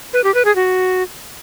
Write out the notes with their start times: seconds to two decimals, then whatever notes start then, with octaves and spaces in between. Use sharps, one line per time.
0.13 B4
0.24 G4
0.34 B4
0.45 G#4
0.55 F#4